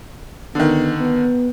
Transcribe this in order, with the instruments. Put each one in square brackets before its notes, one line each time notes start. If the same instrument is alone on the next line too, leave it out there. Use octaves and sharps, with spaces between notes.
[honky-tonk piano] D3 D#3 [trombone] B3
[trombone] B3